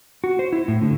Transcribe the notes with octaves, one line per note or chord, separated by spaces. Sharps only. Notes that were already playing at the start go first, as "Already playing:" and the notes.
F#4
C5
E4
A2
D3